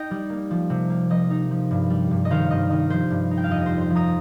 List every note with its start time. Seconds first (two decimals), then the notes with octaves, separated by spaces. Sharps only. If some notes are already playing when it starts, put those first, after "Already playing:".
Already playing: D#4 D#5 G5
0.11 G3
0.30 A#3
0.51 F3
0.70 C3
0.90 A#3
1.10 F3 D#5
1.30 D#4
1.51 F3
1.71 G2
1.90 G3
2.11 G2
2.25 D#5
2.31 D#3 C5 F5
2.51 G2 D#5
2.70 D#3 D#5
2.90 F3 C5
3.10 G2
3.31 D#4
3.37 G5
3.44 F5
3.50 F2 D#5
3.61 C5 D#5
3.71 F4
3.81 C5
3.90 F3
3.95 A#5 D#6